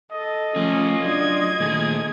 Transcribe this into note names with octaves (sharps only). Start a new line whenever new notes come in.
A4 D#5
F3 A3 C#4 F4 G#4
F#3 D4 D5 G#6
A#2 D#3 A3 G#4